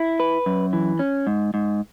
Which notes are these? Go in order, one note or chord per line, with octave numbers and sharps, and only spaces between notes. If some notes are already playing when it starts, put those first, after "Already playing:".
Already playing: E4
B4
F#2
E3
C#4
G#2
G#2